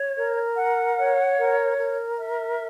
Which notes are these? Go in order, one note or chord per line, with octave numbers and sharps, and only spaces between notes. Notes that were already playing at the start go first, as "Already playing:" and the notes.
Already playing: C#5
A#4
F#5
C#5
A#4
A#4
E5